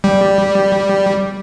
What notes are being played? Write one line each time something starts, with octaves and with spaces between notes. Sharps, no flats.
G3